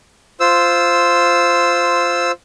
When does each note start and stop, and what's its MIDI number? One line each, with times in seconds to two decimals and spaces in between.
0.40 2.32 65
0.40 2.32 72
0.40 2.32 88